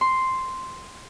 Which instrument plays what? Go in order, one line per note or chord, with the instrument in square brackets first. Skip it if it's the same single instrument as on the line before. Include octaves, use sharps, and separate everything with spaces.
[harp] C6